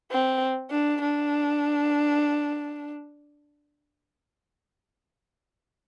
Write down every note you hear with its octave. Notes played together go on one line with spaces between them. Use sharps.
C4
D4
D4